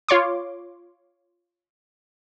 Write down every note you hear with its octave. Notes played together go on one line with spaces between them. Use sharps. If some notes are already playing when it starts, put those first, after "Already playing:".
F4 C#5 C6 D6